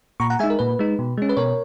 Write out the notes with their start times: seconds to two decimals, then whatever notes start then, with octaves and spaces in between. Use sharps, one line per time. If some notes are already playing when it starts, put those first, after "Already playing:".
0.20 A#2 A#5 C#6
0.30 F#5 A#5
0.39 G#3 E5 G#5
0.43 D#4
0.50 A#4
0.59 A#2 B4
0.79 G#3 D#4
0.99 B2
1.17 G#3 C#4
1.29 B4
1.37 B2 A#4 C#5